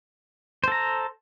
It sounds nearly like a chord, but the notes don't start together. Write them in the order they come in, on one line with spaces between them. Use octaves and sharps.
C5 A4 A#5